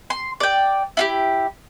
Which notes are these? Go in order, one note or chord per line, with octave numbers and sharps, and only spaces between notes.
C6
D5 G5
E4 F4 G4